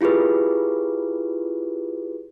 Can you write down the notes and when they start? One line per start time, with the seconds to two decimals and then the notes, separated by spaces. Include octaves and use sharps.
0.01 E4 F4 G4 G#4 B4